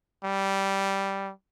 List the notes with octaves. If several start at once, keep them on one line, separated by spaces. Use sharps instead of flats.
G3